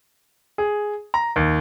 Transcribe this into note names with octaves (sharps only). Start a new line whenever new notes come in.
G#4
A#5
D#2